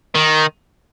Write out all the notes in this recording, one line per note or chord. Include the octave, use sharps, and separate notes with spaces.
D#3